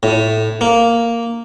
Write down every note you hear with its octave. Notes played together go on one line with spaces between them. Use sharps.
A2
A#3